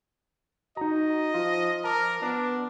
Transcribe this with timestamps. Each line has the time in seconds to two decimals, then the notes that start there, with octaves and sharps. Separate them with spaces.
0.77 D#4 F#4 D#5 A#5
1.34 F3 F4
1.84 F3 A#4 A5 D6
2.22 B3 D4